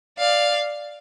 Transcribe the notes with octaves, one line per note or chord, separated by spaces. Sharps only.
D5 F5